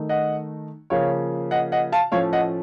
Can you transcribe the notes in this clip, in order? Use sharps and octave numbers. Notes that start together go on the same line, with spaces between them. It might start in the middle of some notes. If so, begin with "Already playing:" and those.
Already playing: D#3 A3 D#4
D#5 F#5
C#3 F3 A#3 C#5 F5
D#5 F#5
D#5 F#5
F5 A5
A2 F3 A3 C#4 C#5 F5
D#5 F#5